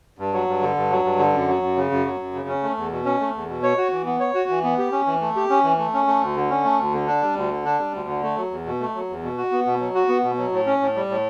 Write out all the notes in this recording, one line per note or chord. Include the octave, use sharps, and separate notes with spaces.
G2
F#3
G2
D3
G2
F#3
G2
D3
F#2
F#3
F#2
C#3
F#2
F#3
F#2
C#3
C#4
A3
E2
B2
C#4
A3
E2
B2
C#5
F#4
E3
B3
C#5
F#4
E3
B3
G4
C#4
E3
A3
G4
C#4
E3
A3
C#4
A3
D2
D3
C#4
A3
D2
D3
D4
G3
D2
D3
D4
G3
D2
D3
A3
F#3
E2
B2
A3
F#3
E2
B2
F#4
B3
B2
F#3
F#4
B3
B2
F#3
A2
C#4
A2
G3
A2